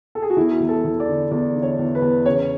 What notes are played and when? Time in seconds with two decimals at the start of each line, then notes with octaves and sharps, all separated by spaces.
0.15 A4
0.22 G#4
0.30 F#4
0.37 E2 E4
0.60 E2
0.69 A4
0.84 E2
1.00 D5
1.08 D3
1.31 E2 D5
1.56 D3
1.63 C#5
1.79 E2
1.95 B4
2.02 E2
2.26 C#3 C#5